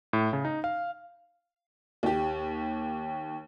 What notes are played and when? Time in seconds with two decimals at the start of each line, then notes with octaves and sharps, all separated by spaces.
0.13 A2
0.33 C#3
0.45 D#4
0.64 F5
2.03 D#2 G4